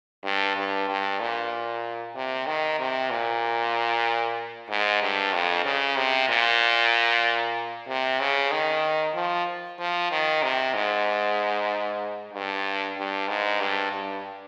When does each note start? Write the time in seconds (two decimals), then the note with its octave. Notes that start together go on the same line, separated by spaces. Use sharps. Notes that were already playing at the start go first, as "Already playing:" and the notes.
0.24 G2
0.57 G2
0.88 G2
1.20 A#2
2.15 C3
2.47 D#3
2.79 C3
3.10 A#2
4.70 G#2
5.02 G2
5.33 F2
5.65 C#3
5.97 C3
6.29 A#2
7.88 C3
8.20 C#3
8.51 D#3
9.15 F3
9.79 F3
10.11 D#3
10.43 C3
10.74 G#2
12.33 G2
12.97 G2
13.28 G#2
13.60 G2
13.92 G2